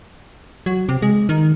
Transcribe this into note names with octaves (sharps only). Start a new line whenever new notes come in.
F#3
C3
G#3
D#3